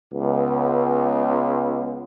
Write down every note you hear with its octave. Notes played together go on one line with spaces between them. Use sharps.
C#2 B3